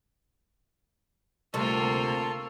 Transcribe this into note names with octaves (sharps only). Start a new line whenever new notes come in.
D2 C3 G3 A#3 F4 A4 A5 C#6